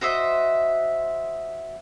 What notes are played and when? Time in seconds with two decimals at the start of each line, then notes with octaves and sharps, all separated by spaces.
0.01 F#4 C5 D#5 E5